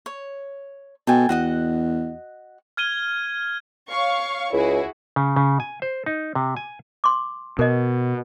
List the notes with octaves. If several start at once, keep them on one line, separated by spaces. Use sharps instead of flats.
C#5
B2 A4 G5 G#5
E2 F#4 D#5 F#5
F6 G#6 D#7 G7
C#5 F5 C#6
C#2 E4 F#4 G#4
C#3
C#3
G#5
C5
D#4
C3
G#5
C6 D6
B2 A#4 D#5